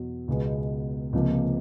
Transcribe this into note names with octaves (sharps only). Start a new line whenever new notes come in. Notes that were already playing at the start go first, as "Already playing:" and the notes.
Already playing: E2 B2 F#3
C#2 B2 G#3 B3
C#2 C3 F3 A#3